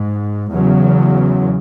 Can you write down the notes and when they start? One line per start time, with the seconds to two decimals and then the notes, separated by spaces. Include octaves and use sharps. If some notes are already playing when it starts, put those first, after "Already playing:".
Already playing: G#2
0.53 E2 C#3 F#3